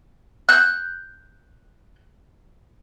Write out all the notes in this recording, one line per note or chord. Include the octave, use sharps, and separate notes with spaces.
F#6 G6